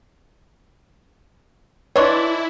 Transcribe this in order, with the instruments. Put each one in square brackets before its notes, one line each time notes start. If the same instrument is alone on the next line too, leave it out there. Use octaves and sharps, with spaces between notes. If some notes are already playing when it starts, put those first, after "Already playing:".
[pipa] E3 D4 [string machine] E4 [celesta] B4 D#5 C6 [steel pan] C#5 C#6